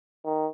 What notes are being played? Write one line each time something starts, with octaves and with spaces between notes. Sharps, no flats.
D#3